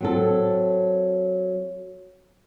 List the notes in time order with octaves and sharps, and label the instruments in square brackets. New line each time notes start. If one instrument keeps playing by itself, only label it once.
[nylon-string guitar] F#3 C4 A4